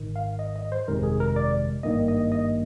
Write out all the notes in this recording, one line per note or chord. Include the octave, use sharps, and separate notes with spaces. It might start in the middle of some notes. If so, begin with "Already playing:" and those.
Already playing: G#1 G#2 D#3
F5
D#5
D#5
C5
G1 F2 C3 D#3 G#3 A#4
G#4
A#4
D5
G#1 G2 D#3 A#3 D#5
D#5
D#5